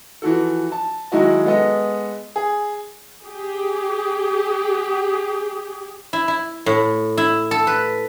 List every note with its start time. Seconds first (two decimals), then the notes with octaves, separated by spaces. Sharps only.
0.22 E3 F3 F#4 A4
0.72 A5
1.12 D#3 F#3 G#3 E4 F#4 D#5
1.46 G#3 B3 A4 B4 D#5
2.36 G#4
3.24 G4 G#4
6.13 E4
6.28 E4
6.66 A2
7.18 E4
7.51 A4
7.67 B4